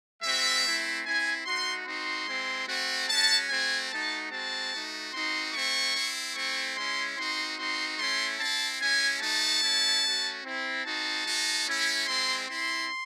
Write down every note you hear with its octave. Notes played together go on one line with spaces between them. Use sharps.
G#3 C4 F#4 E5
A3 C4 E4
C4 E4 G#5
A3 D#4 F#4 C6
C4 D#4 F#4 C6
G#3 C4 E4
A3 C4 F#4
G#3 C#4 F#4 A5
A3 C4 F#4 G#5
A3 D#4 F#4 A5
G#3 C4 F#4 A5
A3 D#4 F#4
C4 D#4 F#4 C6
A3 C4 E4 C#6
C4 E4
A3 C4 E4 C#6
G#3 C#4 E4 C6
C4 D#4 F#4 C6
C4 D#4 F#4 C6
A3 C#4 E4 C6
C4 E4 A5
G#3 C#4 E4 G#5
A3 D#4 F#4 A5
A3 C#4 E4
A3 C#4 F#4
C4 E4
C4 D#4 F#4 A5
G#3 D#4 F#4
A3 C#4 E4
G#3 C4 E4 C6
C4 E4 C6